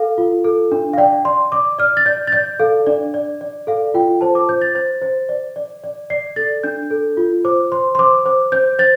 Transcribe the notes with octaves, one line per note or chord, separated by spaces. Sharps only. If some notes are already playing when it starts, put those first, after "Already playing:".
Already playing: A4 F5
F4
A4
D4
F5
D5 G5
D5 C6
D5 D6
D5 F6
A6
D5 G6
A6
D5 G6
A4 F5
D4 D5
D5
D5
A4 F5
F4 G5
C5 A5
D6
C5 G6
A6
C5 A6
C5
D5
D5
D5
D5 C7
A4 A6
D4 G6
A4
F4
C5 D6
C5 C6
C6
C5 D6
C5 D6
C5 G6
C5 A6